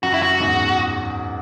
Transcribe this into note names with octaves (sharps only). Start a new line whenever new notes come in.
F#2 F#4
E4
F#4
E2 G#2